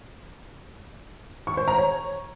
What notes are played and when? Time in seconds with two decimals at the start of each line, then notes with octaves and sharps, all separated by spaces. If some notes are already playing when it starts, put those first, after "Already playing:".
1.47 C#6
1.57 C5
1.68 A#5
1.78 C#5